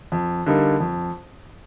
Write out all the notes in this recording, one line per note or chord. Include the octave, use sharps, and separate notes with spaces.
F2
D3 G3 A#3 D#4
F2